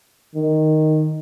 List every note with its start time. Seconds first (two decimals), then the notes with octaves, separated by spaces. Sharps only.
0.35 D#3